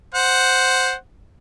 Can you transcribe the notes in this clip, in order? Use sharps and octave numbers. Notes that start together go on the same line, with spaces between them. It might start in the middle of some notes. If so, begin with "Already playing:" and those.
C5 F#5